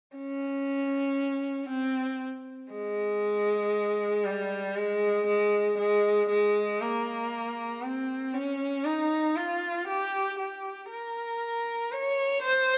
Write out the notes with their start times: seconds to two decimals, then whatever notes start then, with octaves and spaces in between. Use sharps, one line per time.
0.16 C#4
1.69 C4
2.72 G#3
4.25 G3
4.77 G#3
5.27 G#3
5.78 G#3
6.30 G#3
6.81 A#3
7.82 C4
8.34 C#4
8.85 D#4
9.36 F4
9.88 G4
10.39 G4
10.90 A#4
11.92 C#5
12.43 C5